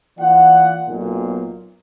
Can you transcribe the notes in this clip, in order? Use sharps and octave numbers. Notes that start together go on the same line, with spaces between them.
E3 A#3 F4 D5 F#5
B1 A#2